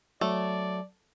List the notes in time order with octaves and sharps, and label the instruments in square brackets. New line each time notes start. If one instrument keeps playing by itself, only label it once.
[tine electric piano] F#3 [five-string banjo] A3 [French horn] D5